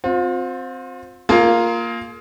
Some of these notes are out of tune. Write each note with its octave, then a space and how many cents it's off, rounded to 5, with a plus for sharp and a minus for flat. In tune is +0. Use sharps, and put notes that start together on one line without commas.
C4 +0 F4 +40
A#3 +0 F4 +0 G#4 +30